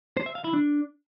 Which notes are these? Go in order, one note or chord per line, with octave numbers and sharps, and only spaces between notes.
C5
E5
F5
E4
D4